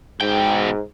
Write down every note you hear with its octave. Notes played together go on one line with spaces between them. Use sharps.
G#2 B2 G5